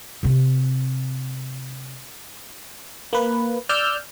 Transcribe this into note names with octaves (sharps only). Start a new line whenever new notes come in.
C3 C4
A#3 B4
D5 E6 F6 G6